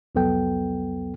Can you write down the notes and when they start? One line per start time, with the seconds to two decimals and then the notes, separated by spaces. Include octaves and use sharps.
0.15 C2 F2 F#3 B3 A4 G5